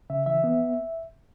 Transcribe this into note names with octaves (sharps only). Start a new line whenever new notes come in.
C#3 E5
E3 E5
B3